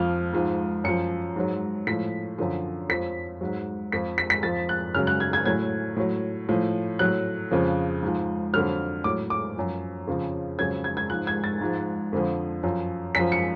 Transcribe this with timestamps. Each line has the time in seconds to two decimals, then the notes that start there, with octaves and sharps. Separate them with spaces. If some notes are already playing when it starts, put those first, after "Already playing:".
Already playing: F2 F3 F6
0.33 G#2 F3
0.84 F#2 F3 C#7
1.36 G#2 F#3
1.87 A2 F3 B6
2.38 F#2 D3 F3
2.89 F2 F3 B6
3.41 G#2 F#3
3.92 F2 F3 B6
4.18 B6
4.30 B6
4.43 F2 F3 A6
4.69 F#6
4.94 F#2 C#3 F#3 F6
5.07 F#6
5.20 G#6
5.33 G#6
5.46 A2 F#3 G#6
5.97 A2 F#3
6.49 A2 F3
6.99 A2 F#3 F#6
7.51 F2 C#3 F3
8.03 G#2 F3
8.53 F2 D3 F#3 F6
9.04 A2 F#3 D6
9.30 D6
9.56 F#2 F3
10.07 F2 C#3 F3
10.59 F2 C#3 F#3 G#6
10.84 G#6
10.97 G#6
11.10 G#2 F3 F#6
11.27 G#6
11.44 A6
11.61 G#2 F3
12.13 F2 D3 F3
12.63 F#2 F3
13.15 F#2 F3 B6
13.32 C#7